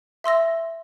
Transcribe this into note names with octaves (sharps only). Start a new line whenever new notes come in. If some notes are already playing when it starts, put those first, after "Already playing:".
E5 C6 E6 A#6